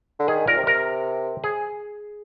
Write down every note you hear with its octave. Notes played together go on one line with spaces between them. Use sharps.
D3
D#3 G#4
A#2 A#4
C3
A#4
G#4